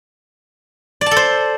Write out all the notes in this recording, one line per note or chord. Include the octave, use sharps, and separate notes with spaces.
D5
A5
A4
C5